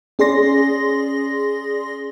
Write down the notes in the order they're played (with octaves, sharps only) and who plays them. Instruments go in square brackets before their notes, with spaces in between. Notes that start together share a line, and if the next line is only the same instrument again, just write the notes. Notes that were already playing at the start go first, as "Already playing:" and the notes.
[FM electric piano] C#4 G#4 D5 C6 A#6